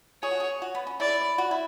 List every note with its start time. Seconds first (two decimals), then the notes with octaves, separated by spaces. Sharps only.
0.22 G#4 C#5
0.31 F#4
0.40 G#4
0.62 F#4
0.75 B3
0.87 C#4
1.00 E4 D5
1.38 F#4
1.51 E4